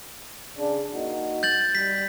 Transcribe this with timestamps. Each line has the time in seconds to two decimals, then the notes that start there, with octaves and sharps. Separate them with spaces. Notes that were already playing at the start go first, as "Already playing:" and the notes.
0.58 C#3 D4
0.93 A#3 D#4 F#4
1.43 G6 A6 F#7
1.75 G3 B6